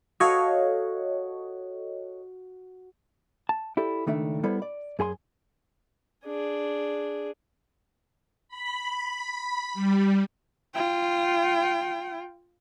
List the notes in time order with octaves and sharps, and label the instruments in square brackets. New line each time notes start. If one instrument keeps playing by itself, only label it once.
[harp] F#4 F5 [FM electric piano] A4 C#5 D#5
[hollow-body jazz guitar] A5
E4 G4 A4 D5
C#2 D#3 A3 D4 E5
G3 B3 E4 A4 C5
D5
F#2 G#4 G#5 C6
[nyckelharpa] D4 G#4
[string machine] B5
G3
[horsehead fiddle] F4 G5